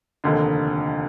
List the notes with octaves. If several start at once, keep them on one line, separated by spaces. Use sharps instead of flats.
F1 D#2 D3